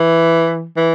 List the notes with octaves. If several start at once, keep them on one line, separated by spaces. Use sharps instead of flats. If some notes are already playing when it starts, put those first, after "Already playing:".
Already playing: E3
E3